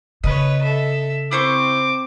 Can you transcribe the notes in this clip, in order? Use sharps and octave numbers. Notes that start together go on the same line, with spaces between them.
C#3 B4 C#5 D#5
A4 E5
C4 E4 C5 C#6 D6